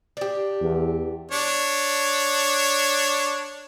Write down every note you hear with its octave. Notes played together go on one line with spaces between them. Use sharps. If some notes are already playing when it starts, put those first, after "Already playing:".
D4 G4
E2
D4 C#5